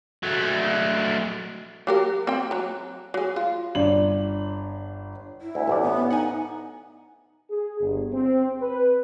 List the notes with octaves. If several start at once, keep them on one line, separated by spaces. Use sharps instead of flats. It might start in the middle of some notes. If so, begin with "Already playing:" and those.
F#3 A3
F#3 G4 A#4
C4 G5
F#3 A#5
F#3 G#4
F4
G1 D4 F#7
E4
D2
A1 D2 D5
B3
D#4 F#5 G#5
G#4
G1
C4
B4